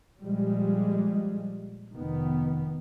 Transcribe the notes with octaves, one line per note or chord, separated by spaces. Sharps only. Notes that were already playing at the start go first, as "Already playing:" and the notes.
A#2 F3 G3 G#3
F1 D#3 B3